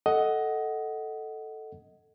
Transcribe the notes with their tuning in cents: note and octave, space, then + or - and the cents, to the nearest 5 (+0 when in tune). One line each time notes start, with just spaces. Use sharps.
A4 +0 D#5 +10 F#5 +10